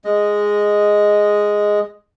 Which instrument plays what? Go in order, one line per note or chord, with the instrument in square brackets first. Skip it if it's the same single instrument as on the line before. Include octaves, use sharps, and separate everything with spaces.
[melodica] G#3 D#5